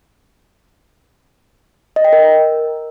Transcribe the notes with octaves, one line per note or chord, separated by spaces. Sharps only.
D#5
G5
A#4